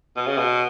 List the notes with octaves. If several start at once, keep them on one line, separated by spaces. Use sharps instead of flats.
B2
C#3
B2